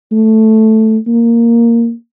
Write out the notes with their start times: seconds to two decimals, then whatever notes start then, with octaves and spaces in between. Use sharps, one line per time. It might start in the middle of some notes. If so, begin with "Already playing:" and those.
0.12 A3
1.07 A#3